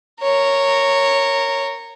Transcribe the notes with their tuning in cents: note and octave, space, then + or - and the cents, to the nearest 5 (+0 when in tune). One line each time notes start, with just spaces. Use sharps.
A#4 -15 C#5 -5